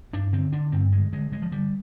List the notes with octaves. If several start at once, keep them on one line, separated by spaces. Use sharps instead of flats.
G2 D4
D3 C4
D3 D4
G2 C4
D3 G#3
D3 G#3
D3 G#3
F3
D3 G3